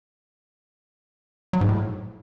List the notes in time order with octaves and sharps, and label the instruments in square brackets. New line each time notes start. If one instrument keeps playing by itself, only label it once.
[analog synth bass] F#3
G#2
A2